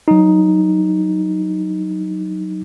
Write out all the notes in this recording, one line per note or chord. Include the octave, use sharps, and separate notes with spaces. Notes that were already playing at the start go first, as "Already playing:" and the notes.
F#3 D#4